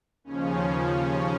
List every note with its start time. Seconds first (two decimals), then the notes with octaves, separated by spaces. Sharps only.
0.24 D#2 C#3 F3 C#4
0.99 C#4